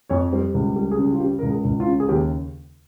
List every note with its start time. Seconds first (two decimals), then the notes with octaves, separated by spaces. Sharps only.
0.09 F2 C#5
0.33 G3 C5
0.54 C#2
0.76 G3
0.91 G#4
0.98 C#3
1.12 F4
1.20 C#3 G4
1.39 C#2 A#4
1.50 G#4
1.65 C#2
1.80 F4
1.87 C#3
2.00 G#4
2.09 D#2 G4